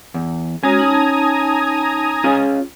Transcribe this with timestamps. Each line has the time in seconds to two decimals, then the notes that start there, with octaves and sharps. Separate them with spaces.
0.14 E2
0.63 G#3 C#4 F#4 G#5 A#5 D#6
0.79 D#4 A5
2.24 C#4 F4 G#4